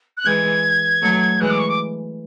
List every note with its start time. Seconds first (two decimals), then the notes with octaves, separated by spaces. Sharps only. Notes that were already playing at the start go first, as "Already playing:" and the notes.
0.17 F#6
0.25 E3 G#3 G#6
1.02 F#3 A3
1.40 E3 G#3 F#6
1.50 D6
1.59 C#6
1.69 D6